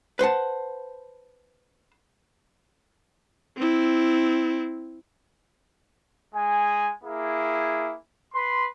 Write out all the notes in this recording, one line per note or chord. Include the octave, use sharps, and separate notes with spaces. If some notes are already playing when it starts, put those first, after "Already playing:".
B4 C5 F#5 A5
C4 E4
G#3 G#5
A#3 E4 G#4
B4 C6